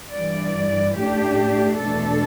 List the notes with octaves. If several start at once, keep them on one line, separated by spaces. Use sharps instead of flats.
G2 E3 G3 D5
A2 A3 D4 G4
E2 B2 A3 D4 A4